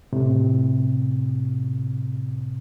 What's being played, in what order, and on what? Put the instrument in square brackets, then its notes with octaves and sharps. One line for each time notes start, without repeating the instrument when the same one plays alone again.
[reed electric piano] A2 C3